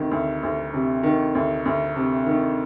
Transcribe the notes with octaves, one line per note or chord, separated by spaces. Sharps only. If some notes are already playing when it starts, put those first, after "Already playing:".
Already playing: D2 C3 D#3
D2
D2
C3
D#3
D2
D2
C3
D#3